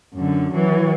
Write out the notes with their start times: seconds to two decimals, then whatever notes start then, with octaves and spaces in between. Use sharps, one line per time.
0.14 F#2 D3
0.53 E3 F#3